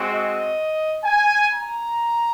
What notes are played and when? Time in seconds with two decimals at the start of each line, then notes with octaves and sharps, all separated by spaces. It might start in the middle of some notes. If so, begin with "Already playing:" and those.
Already playing: G#3 C4 F#4
0.11 D#5
1.04 G#5
1.51 A#5